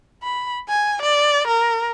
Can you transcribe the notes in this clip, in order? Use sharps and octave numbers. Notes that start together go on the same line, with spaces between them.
B5
G#5
D5
A#4